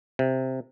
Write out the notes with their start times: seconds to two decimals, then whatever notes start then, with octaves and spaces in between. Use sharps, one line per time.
0.19 C3